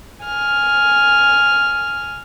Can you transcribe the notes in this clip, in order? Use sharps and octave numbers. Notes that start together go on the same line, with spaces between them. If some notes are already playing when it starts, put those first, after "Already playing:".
G#5 F6